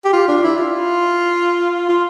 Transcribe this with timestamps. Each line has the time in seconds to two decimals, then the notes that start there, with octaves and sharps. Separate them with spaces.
0.05 G4
0.13 F4
0.28 D4
0.43 E4
0.58 F4
1.89 F4